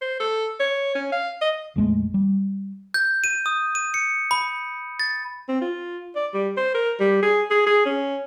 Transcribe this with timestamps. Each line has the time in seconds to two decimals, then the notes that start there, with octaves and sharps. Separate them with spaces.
0.02 C5
0.20 A4
0.60 C#5
0.95 C#4
1.12 F5
1.41 D#5
1.76 A#1 F2 G#3 A3
2.14 G3
2.94 G6
3.24 D#7
3.46 D#6
3.75 D#7
3.94 C#7
4.31 B5
5.00 A6
5.48 C4
5.61 F4
6.15 D5
6.34 G3
6.57 C5
6.74 A#4
7.00 G3
7.23 G#4
7.50 G#4
7.66 G#4
7.86 C#4